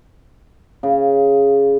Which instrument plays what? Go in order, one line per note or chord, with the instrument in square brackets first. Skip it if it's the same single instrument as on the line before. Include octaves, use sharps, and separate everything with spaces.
[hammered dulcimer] C#3